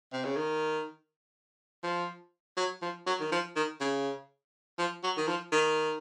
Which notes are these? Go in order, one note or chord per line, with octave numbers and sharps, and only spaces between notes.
C3
C#3
D#3
F3
F#3
F3
F#3
D#3
F3
D#3
C#3
F3
F#3
D#3
F3
D#3